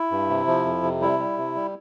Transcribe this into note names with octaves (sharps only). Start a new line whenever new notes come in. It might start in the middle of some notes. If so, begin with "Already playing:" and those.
Already playing: E4
G2
C3
F3
F2
C3
G3 E4
G3
C3
G3